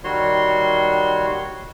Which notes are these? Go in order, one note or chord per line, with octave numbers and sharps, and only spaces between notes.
D#3 G3 F#4 C#5 C6